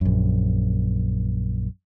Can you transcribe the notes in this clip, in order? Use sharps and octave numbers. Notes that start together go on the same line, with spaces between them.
A#1 F#2